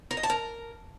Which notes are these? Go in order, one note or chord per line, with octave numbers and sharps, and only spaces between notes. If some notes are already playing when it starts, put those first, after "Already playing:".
A#4
D#5
A5
A#4